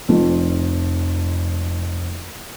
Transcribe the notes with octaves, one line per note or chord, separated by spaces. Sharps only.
F1 F2